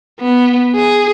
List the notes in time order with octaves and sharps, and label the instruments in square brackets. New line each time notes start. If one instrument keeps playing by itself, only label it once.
[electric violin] B3
G#4